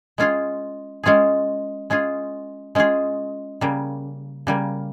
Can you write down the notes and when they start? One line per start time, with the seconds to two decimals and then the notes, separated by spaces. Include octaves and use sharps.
0.18 G#3 C#4 F4 G#4
1.03 G#3 C#4 F4 G#4
1.90 G#3 C#4 F4 G#4
2.75 G#3 C#4 F4 G#4
3.61 C#3 G3 A#3
4.47 C#3 G3 A#3